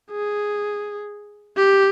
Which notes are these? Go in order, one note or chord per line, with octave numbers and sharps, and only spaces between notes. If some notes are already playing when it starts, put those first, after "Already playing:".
G#4
G4